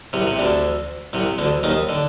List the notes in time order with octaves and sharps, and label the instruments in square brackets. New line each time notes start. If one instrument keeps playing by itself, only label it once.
[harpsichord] C2 C3
C3
D2 D3
C2 C3
D2 D3
D#2 D#3
D3